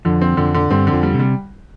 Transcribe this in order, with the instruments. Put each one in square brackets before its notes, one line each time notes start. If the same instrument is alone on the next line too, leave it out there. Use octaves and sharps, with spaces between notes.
[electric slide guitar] F2 F3 [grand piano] D3
[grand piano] C4
[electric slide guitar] F2 F3 [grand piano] D3
[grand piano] D3
[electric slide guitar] G2 G3 [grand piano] C4
[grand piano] D3
[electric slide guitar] F2 F3
[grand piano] G3
[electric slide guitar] C3
[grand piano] G3